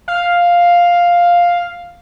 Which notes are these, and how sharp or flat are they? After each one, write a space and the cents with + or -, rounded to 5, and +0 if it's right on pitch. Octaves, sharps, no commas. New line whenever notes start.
F5 +5